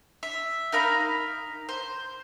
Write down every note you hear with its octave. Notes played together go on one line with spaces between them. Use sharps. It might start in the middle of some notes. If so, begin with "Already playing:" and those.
E5
D#4 A#4 F5 B5
C5